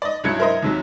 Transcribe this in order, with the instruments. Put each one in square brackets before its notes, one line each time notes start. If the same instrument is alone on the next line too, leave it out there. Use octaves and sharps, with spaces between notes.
[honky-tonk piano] D5 D#5
C2 G2 F#3 G#6 C#7
E4 A#4 C5 D#5
D#2 C3 F#3